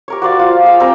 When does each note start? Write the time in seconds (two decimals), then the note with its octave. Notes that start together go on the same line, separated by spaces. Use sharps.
0.08 G4 A#4 C#5
0.22 F#4 C5 D5 F5
0.39 F4
0.64 G#4 F5 G5
0.80 G3 C4 A#4 G5